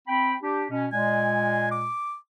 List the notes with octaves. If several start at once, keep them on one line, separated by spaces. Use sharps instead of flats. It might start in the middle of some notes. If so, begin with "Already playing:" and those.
C4 G5 B5
D4 G4
B2 C#4
A#2 G#3 G#5
D6